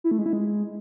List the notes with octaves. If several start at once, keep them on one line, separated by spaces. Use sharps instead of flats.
E4
A3
G#3
E4
G#3